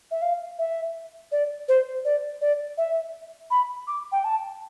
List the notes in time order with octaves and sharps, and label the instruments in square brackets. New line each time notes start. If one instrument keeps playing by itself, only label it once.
[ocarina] E5
F5
E5
D5
C5
D5
D5
E5
B5
D6
G5
A5